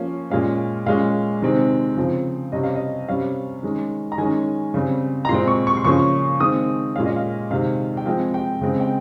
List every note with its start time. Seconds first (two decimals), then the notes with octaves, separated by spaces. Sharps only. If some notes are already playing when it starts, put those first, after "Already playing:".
Already playing: F3 A#3 C#4
0.30 A#2 G#3 C#4 F5
0.86 A#2 G#3 C#4 F5
1.42 C3 D#3 G#3 C4
1.97 C#3 F3 C4
2.52 C3 G3 C#4 D#5
2.63 F5
2.75 D#5
3.08 C3 G3 C#4 F5
3.63 D#3 G#3 C#4
4.12 A#5
4.18 D#3 G#3 C#4 G#5
4.74 C#3 G3 C4
5.25 A#5
5.29 A#2 C6
5.32 G#3 C4
5.48 C#6
5.67 C#6
5.77 C6
5.84 C#3 F3 A#3 C#4 C#6
6.40 D#3 G#3 C4 D#6
6.95 A#2 G#3 C#4 F5
7.05 D#5
7.16 F5
7.51 C3 D#3 G#3 F5
7.97 G5
8.06 F3 G#3 C4 F5
8.34 G5
8.61 C#3 G#3 C4
8.80 G5